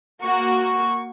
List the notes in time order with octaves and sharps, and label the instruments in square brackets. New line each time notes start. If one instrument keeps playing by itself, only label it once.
[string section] A#3 F#4 [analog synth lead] C#6